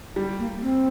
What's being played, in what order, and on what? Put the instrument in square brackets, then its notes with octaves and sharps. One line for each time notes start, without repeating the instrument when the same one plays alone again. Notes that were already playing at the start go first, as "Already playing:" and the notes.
[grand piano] G3
[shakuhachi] A#3
C4